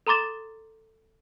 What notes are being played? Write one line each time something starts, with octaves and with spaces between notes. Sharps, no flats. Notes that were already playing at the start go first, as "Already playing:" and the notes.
A4 A#5 C6 D6 A6 E7